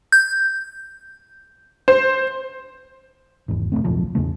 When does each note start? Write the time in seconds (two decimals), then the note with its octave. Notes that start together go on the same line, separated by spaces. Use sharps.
0.12 G6
1.88 C5
3.48 G#1 E2
3.72 E1 E2 A3 C4
3.84 D1 B1 F2 F3
4.15 A1 E2 C#3 A3